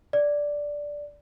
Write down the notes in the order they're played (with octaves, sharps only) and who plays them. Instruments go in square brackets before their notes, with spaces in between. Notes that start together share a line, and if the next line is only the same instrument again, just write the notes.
[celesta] D5